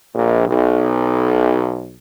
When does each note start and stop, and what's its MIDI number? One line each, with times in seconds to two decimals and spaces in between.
0.14 0.44 34
0.47 1.97 35